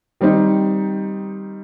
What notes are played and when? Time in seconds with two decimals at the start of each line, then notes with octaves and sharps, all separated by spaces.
0.21 D#3 G3 C4 D#4